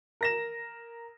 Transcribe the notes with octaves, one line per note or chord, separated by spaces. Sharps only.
A#4 A#6 E7